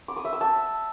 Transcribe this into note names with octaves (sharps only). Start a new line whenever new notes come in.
D6
D#6
E5
E6
A5